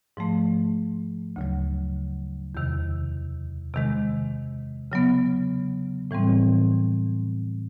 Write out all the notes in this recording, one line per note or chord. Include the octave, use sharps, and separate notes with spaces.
G#2 F3 A3
D2 C#3 F#3
E2 C3 D#3
C3 D#3 G#3
C#3 F#3 B3
A2 E3 G3 C4